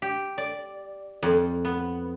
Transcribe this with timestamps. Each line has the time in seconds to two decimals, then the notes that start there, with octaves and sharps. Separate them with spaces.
0.02 G4
0.38 D5
1.23 F2
1.65 B3